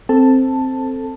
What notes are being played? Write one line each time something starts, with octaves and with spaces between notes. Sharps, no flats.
C4 A4 A5